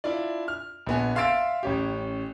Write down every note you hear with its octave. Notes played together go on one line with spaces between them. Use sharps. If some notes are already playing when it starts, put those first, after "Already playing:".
D4 E4 F4 D5
F6
A#1 B3 G#5
E5 F5 C6 E6 A6 D7
A1 C#4 G4